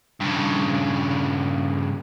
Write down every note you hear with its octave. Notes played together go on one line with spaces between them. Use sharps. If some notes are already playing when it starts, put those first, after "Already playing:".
G2 C#3